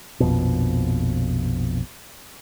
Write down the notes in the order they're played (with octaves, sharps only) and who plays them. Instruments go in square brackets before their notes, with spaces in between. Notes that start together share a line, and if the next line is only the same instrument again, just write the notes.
[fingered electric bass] A#1 F2 B2